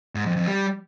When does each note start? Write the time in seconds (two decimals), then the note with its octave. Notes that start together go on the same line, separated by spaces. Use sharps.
0.15 G#2
0.26 F2
0.37 F2
0.47 G3